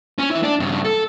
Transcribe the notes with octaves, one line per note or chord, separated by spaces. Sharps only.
C#4
E3 E4
D4
G2 C#3
A4